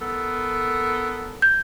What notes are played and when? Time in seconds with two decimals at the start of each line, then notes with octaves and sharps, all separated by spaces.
0.01 B3 A4 A#4
1.42 G6